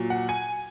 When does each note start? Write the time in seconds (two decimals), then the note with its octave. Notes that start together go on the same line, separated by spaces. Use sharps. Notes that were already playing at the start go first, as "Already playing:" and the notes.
Already playing: A#2 F#3
0.10 F#5
0.29 G#5